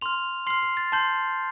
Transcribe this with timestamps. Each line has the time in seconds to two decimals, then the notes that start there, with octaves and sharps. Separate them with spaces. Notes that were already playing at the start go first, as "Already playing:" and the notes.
0.01 C6 F6 F7
0.47 C6 F6 C7
0.63 C7
0.77 A6
0.92 A5 C6 G6 C7